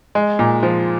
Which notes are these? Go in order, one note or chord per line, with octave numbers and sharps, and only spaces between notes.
G#3
A#2
F3